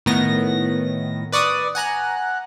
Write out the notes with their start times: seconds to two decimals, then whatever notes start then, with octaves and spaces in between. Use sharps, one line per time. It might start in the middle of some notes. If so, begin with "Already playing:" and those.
0.06 A2 D#3 B3 A#6
1.32 B4 D5 C#6 D#6
1.75 F#5 G#5 A#5 F#6